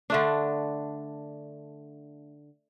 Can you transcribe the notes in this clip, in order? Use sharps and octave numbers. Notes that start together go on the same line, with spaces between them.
D3 A3 D4